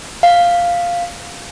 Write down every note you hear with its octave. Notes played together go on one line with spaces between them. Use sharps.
F5